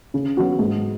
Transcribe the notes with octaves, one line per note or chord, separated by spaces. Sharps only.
C#3
F#3 B3 F#4
G#2